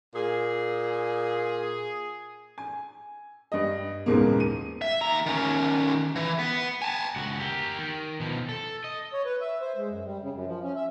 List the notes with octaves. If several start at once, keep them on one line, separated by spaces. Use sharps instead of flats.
A#2 G#4
G#5
G2 D#5
D#1 E2 G#2 C#3 G#3 A#3
D#7
E5
D#2 A#5
D#3 C#4
E3
B3
G#5 A5
C#2 F#4
G4 A#4
D#3
B2 F3
A4
D#5
C#5
B4
E5
C5
G#3
F#2
G3
C#3
F#2
F3
C#4
E5